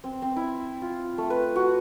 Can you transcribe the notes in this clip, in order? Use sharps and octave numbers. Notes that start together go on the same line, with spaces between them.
C4
C4
E4
F4
A3
B4
F#4